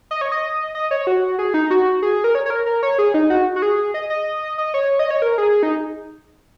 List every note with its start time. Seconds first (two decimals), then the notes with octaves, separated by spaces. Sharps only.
0.11 D#5
0.21 C#5
0.32 D#5
0.75 D#5
0.91 C#5
1.07 F#4
1.39 G#4
1.54 D#4
1.70 F#4
2.02 G#4
2.24 A#4
2.35 C#5
2.46 C#5
2.50 A#4
2.66 A#4
2.83 C#5
2.99 G#4
3.14 D#4
3.30 F#4
3.56 F#4
3.62 G#4
3.94 D#5
4.10 D#5
4.58 D#5
4.74 C#5
4.99 D#5
5.11 C#5
5.22 A#4
5.38 G#4
5.63 D#4